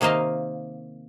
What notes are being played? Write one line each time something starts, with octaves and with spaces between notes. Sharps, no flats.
C3 D#3 A#3 C5 D#5 F5